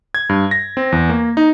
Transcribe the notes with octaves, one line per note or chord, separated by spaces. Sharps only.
G#6
G2
A#6
C4
E2
A#3
D#4